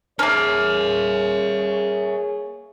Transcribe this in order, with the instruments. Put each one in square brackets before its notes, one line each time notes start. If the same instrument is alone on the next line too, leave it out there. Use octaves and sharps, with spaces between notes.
[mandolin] A#3 C#4 [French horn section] G#4 C#5 [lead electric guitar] A#4 E5